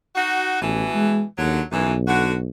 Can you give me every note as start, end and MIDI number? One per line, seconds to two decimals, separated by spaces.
0.15 0.59 63
0.15 0.59 66
0.62 0.85 33
0.62 1.24 47
0.62 1.24 52
0.95 1.22 56
1.38 1.60 39
1.38 1.62 50
1.38 1.62 54
1.72 2.49 35
1.72 1.94 42
1.72 1.94 52
2.08 2.35 50
2.08 2.35 66